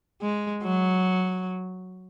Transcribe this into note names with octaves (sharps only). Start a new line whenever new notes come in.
G#3
F#3